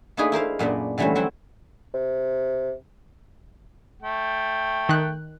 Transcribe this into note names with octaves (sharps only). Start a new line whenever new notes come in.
A3 A#3 D4 D#4 G#4 B4
E4 A#4 C5 F5
F#2 A#2 B3 D4
D3 E3 G3 A3 C4 C#4
F#3 C4 E4 F#4
C3
A3 G5
D#3 F#6